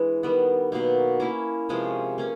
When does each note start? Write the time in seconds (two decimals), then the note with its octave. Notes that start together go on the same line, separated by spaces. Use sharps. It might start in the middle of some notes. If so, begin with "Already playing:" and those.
Already playing: E3 G#3 D4
0.23 D#3 G3 B3
0.72 B2 F#3 A#3 D#4
1.20 A#3 C#4 E4
1.69 C3 F3 G#3 C#4
2.18 A#3 C#4